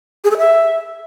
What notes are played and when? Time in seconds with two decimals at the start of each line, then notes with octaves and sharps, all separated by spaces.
0.24 G#4
0.31 A4
0.37 E5